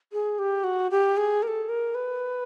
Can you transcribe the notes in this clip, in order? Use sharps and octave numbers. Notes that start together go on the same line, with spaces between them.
G#4
G4
F#4
G4
G#4
A#4
A4
A#4
B4